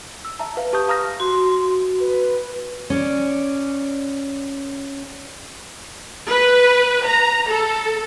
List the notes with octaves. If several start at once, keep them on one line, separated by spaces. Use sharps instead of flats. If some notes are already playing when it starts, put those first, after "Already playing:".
E6
E5 A5 A#5
B4 F5
G4 A5 C#6 D#6 G6
F5 A#5 D#6 F6 A#6
F#4 C6
B4
C#4 D5
B4
A#5
A4